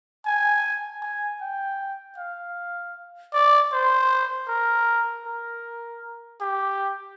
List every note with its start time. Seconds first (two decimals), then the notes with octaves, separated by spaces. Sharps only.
0.26 G#5
1.02 G#5
1.41 G5
2.18 F5
3.33 D5
3.72 C5
4.48 A#4
5.26 A#4
6.41 G4